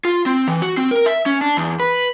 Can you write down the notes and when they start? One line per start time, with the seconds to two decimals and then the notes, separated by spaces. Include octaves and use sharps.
0.05 F4
0.26 C4
0.48 E3
0.62 F#4
0.77 C4
0.91 A#4
1.06 E5
1.26 C#4
1.41 D4
1.57 E2
1.80 B4